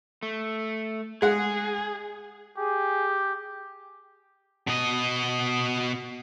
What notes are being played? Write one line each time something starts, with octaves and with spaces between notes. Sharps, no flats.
A3
G#3 G#4 F#5
G4 G#4
B2 D#5